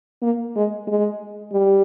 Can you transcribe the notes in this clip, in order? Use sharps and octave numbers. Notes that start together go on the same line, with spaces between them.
A#3
G#3
G#3
G3